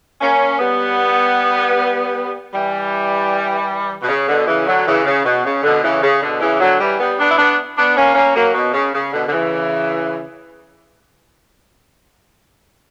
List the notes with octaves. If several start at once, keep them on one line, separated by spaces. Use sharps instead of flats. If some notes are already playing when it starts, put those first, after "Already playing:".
A#3 C#4
G3 B3
E3 G3
B2
C#3
B2 D3
C#3 E3
D3 F#3
C#3 E3
C#3
B2
C#3
B2 D3
C#3 E3
C#3
B2 D3
C#3 E3
D3 F#3
E3 G3
G3 B3
B3 D4
E4
B3 D4
B3 D4
A#3 C#4
A#3 C#4
F#3 A#3
B2
C#3
C#3
B2 D3
D3
C#3 E3